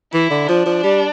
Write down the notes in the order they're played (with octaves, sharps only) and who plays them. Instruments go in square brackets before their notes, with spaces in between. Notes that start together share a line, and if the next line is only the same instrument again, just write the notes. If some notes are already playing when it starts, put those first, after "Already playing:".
[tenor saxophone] E3 [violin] E4
[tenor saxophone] D3
[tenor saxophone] F3 [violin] D4
[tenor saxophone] F3
G3